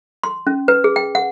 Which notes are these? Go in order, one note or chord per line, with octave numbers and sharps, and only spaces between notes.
C6
C#4
B4
G#4
G5
F#5